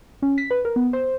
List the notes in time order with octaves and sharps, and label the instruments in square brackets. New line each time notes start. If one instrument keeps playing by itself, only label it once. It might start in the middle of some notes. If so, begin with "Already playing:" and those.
[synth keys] C#4
B6
B4
A#4
B3
C5